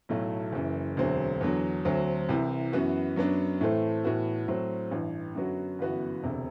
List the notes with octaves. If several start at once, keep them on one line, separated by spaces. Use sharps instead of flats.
B1 A2 F#3 A3 E4
F#1 F#2 E3
E1 D2 D3 F#3 C4
E2 D3 F#3
D2 D3 F#3 C4
C2 C3 E3
F#2 E3 B3 F#4
F#2 F#3 B3 D4
A2 E3 A3 C4
A2 E3 B3 F#4
A2 F#3 C4
A1 G2 E3
F#2 D3 F#3 B3 F#4
G1 F#2 E3 B3 F#4
E1 D2 C3